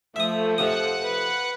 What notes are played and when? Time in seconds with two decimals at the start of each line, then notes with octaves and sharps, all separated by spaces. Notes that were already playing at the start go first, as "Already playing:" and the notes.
0.16 F3 A3 E5 D#6
0.58 F2 C3 F#5 D#6
1.03 B4